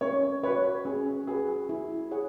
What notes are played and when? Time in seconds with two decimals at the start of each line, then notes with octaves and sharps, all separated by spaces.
0.01 C#4 C#5
0.43 F#4 B4 C#5
0.85 C#4 G#4
1.27 F#4 G#4 B4
1.69 E4
2.11 G#4 C#5 F#5